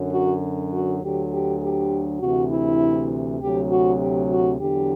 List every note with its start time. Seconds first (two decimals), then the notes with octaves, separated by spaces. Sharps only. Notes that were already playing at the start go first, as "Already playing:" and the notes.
Already playing: F#2 D3 F#3
0.12 F#4
0.72 F#4
1.01 D2 D3 F#3 G4
1.32 G4
1.61 G4
2.21 D2 C3 E3 F#4
2.51 E4
3.40 D2 C3 F#3 G4
3.71 F#4
4.00 G4
4.30 F#4
4.60 E2 D3 F#3 G4